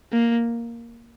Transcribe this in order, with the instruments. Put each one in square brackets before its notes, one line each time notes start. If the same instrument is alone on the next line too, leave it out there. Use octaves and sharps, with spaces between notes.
[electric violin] A#3